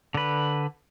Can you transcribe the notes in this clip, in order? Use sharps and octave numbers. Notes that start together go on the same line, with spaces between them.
D3 B4